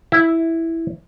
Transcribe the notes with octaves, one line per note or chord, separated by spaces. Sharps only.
E4